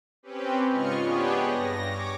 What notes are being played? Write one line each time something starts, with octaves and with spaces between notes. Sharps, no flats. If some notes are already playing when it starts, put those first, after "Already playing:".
C4 C#4 G4 B4
G#2 C#3 F4 D#5 C#6 F6
B3 D4 G4 G#4 B4 C#5
G2 A#6
C#5 D6